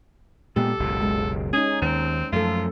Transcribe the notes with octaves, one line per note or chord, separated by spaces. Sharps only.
A#2 G#3 B3 G4 A4
F#1 C#2 B2
G#3
C#4 D#4 G#4
D#2 C4
F#2 F3 A3 F4 A4